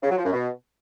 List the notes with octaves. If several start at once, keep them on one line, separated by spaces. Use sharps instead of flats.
C#3
F#3
F3
F#2
B2